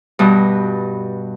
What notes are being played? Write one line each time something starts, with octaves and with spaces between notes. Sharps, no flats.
G2 B2